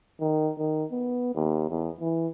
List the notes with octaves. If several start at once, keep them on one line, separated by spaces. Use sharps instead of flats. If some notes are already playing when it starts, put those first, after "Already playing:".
D#3
D#3
B3
D#2
E2
E3